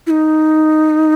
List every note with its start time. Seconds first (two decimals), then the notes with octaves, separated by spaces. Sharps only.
0.07 E4
0.10 D#4